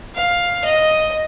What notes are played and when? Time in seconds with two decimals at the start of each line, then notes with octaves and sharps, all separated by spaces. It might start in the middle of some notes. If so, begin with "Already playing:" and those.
0.15 F5
0.64 D#5